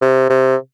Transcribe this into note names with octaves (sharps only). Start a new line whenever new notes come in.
C3
C3